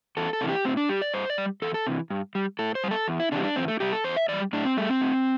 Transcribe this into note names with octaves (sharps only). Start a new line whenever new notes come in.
E2 A4
A4
C3 E3
G4
A2 C4
D4
G3 G4
D5
G2 C5
D5
G3
E2 A4
A4
C3 E3
G2
G3
A2 A4
C5
G3
A4
E2
E4
C3 E3 G3 D4
D4
E2 C4
A3
C3 G3 G4
A4
E2 C5
E5
E3 G3 D5
A2 D4
C4
G3 A3
C4
A2